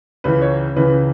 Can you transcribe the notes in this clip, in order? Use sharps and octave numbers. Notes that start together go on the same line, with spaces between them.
C#2 C#3 E3 B4
C#5
C#2 C#3 E3 B4